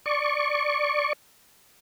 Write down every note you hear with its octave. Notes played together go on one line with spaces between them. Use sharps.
D5 C#6